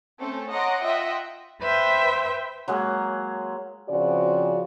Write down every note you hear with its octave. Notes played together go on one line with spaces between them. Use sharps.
A3 C4 C#4 A4
C#5 D#5 F#5 A#5 C6 D6
F4 D#5 E5 F#5 G5 C6
B4 C5 E5 G5
F#3 G#3 A#3 G#4
C#3 F3 C4 F#4 D5